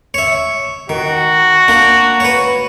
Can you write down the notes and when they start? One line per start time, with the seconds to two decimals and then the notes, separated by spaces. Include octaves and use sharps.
0.14 C#5 E5
0.89 D#3 F#4
1.68 A#3 D4
2.20 B4 C#5